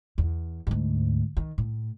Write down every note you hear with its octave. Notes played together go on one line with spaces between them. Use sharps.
E2
D2 G#2
D#3
A2